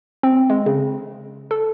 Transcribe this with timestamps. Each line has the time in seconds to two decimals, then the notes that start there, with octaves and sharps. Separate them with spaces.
0.23 C4
0.50 G#3
0.66 C#3
1.51 A4